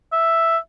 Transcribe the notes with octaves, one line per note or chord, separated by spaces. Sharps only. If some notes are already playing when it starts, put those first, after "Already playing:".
E5